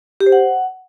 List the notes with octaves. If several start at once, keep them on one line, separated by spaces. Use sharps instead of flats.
G4
C5
F#5